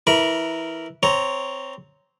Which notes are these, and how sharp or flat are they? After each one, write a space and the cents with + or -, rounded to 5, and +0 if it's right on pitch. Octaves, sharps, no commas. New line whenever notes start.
E3 -10 A#4 -10 B5 -30
C4 -10 C#5 +0 A#5 +0